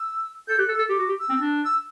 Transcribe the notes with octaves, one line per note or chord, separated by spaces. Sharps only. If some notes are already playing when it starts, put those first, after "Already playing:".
Already playing: E6
A4 G6
G4 F#6
A4
E6
A4
G4 D6
F#4
G4
E6
C4
D4
E6